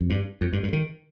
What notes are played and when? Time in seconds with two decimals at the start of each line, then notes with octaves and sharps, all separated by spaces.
0.01 F2
0.10 G2
0.41 F2
0.53 G2
0.63 G2
0.73 D#3